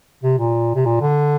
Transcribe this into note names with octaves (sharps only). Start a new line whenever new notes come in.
C3
A#2
C3
A#2
D3